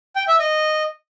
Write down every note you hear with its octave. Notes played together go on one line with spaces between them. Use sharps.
G5
E5
D#5